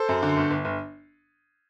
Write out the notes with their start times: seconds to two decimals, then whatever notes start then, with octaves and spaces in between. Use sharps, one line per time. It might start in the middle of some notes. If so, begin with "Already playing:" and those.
Already playing: A4 C5
0.09 F#2
0.23 D3
0.37 G1
0.51 G1
0.65 G1